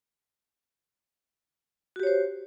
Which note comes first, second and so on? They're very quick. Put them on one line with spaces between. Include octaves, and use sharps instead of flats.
F#4 G4 C#5 C5